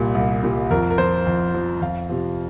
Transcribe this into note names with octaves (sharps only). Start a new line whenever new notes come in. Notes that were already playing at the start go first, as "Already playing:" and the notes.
Already playing: C2 A#2 G3
C2
A#2 G3
F2 A#4
A#4
F3 C5
F2
F3
F2 F5
C3 F3